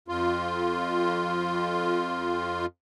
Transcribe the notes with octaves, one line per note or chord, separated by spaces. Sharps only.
F2 F4